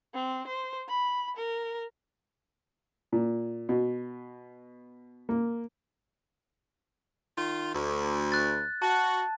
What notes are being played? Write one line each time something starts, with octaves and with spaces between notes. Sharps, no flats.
C4
C5
B5
A#4
A#2
B2
A#3
D#3 F4
D2
F#6 A6
F#4 A5